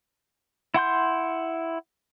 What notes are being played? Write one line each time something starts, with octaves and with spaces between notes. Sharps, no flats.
E4 F#5 C6 G6